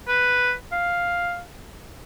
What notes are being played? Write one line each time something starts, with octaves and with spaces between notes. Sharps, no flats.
B4
F5